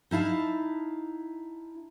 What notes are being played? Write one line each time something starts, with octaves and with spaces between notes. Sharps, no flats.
D#4 E4 F5 A5